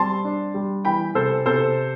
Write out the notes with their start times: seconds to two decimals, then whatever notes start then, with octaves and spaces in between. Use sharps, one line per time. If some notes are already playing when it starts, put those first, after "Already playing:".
Already playing: G3 C4 A5 C6
0.24 D4
0.54 G3
0.85 E3 G5 B5
1.15 C3 A4 C5
1.46 C3 A4 C5